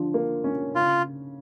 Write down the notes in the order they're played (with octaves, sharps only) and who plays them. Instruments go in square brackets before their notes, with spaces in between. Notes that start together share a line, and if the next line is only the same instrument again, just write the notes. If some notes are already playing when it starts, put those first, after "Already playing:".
Already playing: [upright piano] D3 F3
A#3
C#4
[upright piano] C#3 [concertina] F4